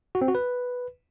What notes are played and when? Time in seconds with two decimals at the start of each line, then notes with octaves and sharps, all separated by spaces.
0.15 F#4
0.21 C4
0.28 F#4
0.35 B4